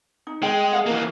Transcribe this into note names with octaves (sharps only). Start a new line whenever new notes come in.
D#4
G#3 G5
D#5 F5 F#5
E3 A#3